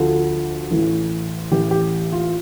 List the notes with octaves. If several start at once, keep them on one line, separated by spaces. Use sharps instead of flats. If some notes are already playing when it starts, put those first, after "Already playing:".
Already playing: D2 D3 F3 F4
A1 A2 E3
A1 A2 E3 G4
G4
F4